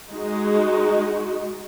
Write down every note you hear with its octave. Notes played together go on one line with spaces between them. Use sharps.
G#3 D#4 F#4